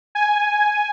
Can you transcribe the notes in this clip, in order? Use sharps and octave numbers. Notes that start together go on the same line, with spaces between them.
G#5